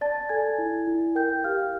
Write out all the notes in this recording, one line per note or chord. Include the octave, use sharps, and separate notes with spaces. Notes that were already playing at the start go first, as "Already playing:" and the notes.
D5 A5 A6
A4 G#5 G#6
E4
E4
A#4 G5 G6
G4 F5 F6